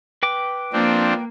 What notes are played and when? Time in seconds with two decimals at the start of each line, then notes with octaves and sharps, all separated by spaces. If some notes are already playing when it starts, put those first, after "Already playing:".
0.23 B4 G5 D6
0.73 F3 A#3 C4 D4